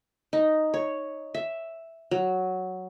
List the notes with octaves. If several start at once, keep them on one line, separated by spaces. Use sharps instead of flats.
D#4
C#5
E5
F#3